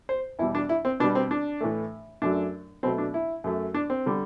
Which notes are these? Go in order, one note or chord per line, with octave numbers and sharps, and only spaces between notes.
C5
E2 B2 G3 E4
D4
E4
C4
B2 G3 D4
C4
D4
A2 E3 A3
F#2 F#3 A3 D4
B2 F#3 A3 C4
D4
E4
F#2 F#3 A3
D4
C4
D3 G3